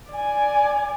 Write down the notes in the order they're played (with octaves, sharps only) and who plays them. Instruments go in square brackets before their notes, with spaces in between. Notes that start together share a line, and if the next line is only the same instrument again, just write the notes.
[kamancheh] D5 G#5